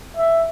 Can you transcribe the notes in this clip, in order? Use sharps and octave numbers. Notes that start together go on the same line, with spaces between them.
E5